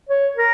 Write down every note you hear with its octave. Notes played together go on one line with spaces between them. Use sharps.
C#5
A#4